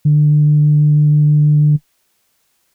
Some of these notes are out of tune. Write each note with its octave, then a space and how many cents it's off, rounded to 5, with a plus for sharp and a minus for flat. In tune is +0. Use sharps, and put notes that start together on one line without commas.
D3 +25